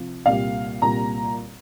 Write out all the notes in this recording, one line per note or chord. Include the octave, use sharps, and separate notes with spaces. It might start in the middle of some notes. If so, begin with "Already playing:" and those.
Already playing: C3 F3
C2 A#2 G3 F5
C2 A#2 G3 A#5